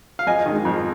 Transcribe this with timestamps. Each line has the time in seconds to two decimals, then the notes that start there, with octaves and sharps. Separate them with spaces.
0.19 F5
0.26 F2 D#5 G#5
0.46 D#3 G#3
0.65 F2